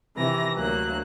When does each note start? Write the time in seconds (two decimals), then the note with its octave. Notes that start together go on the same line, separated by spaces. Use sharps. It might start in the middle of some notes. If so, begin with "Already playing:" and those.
0.17 C3 D#3 E3 A#5 A#6
0.56 D2 F#3 A#3 F#6